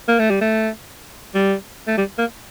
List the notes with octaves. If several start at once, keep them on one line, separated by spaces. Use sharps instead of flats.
A#3
A3
G3
A3
G3
A3
G3
A#3